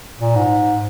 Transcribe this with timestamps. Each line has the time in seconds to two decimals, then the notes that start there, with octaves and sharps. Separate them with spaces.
0.20 A#2
0.35 G#2